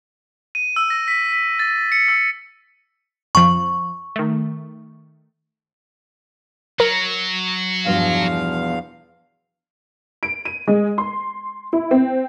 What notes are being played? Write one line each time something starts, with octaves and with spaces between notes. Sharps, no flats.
D#7
E6
A#6
B6
B6
A6
C#7
E6
F2 F3 C#6
D#3 A3
F#3 A#4
E2 G2 B2 F3 F5
D7
D#7
G#3
C6
E4
C4